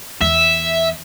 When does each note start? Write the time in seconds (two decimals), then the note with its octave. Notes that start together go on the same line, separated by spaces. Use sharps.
0.21 E2 E5